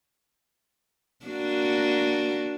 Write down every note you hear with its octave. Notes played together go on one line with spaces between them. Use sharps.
A#3 D4 F#4